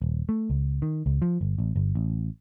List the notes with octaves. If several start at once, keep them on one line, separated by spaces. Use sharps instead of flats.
D#1
A3
C#2
D#3
C#2
F3
G1
A1
G1
A1